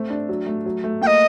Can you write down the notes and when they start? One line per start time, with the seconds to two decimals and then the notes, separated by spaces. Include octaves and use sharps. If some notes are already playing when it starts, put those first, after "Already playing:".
Already playing: A3 C4
0.10 D4
0.29 F#3
0.47 A3
0.66 F#3
0.84 A3
1.02 A#3 G5
1.07 D#5